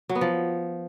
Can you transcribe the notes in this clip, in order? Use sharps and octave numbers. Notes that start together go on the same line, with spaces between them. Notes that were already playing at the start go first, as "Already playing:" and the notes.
F#3
B3
F3